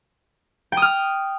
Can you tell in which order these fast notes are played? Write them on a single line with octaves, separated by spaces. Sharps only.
G5 D#6 F6